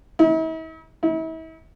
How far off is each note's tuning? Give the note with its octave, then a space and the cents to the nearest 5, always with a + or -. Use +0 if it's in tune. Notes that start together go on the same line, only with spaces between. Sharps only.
E4 -45
E4 -40